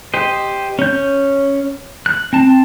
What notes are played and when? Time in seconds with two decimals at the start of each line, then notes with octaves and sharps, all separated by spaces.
0.14 G4 C5 D#5
0.79 C#4 G6
2.06 F#6
2.33 C4 A5